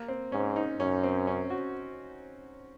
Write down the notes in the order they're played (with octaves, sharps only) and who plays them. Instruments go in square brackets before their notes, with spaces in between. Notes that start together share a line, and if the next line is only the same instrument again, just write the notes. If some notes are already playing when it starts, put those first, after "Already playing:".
Already playing: [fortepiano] A#3
C4
[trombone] G#2 [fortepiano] C#4
[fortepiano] D#4
[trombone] F#2 [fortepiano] C#4
[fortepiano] C4
C#4
F#4